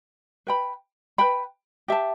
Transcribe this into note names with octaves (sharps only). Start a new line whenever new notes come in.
B4 G5 B5
B4 G5 B5
G4 E5 A5